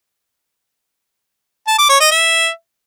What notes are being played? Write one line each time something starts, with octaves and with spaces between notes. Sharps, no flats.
A5
D6
C#5
D#5
E5